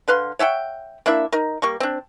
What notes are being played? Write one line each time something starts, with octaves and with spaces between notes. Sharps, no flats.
D3 B4 F5 C6
C#5 E5 F#5 G5
A#3 D4 E4 E5
D#4 A#4
G3 A#3 C#6
C4 D4